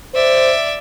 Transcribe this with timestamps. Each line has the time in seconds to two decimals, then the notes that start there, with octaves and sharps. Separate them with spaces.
0.14 C5 D5 E5